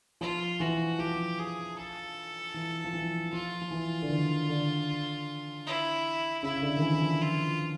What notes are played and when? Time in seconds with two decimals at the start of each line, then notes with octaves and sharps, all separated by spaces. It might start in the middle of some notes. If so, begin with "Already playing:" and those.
0.21 F3 F4
0.60 E3 F#4
0.99 F3 G4
1.39 G#4
1.77 A4
2.54 E3
2.84 F3
2.94 E3
3.32 F3 F4
3.61 F3
3.71 E3
4.02 D3
4.10 D#3
4.49 D3
5.66 E4
6.43 C#3 E4
6.62 D3
6.77 D#3
6.82 E3
6.94 E3
7.01 F3
7.21 F4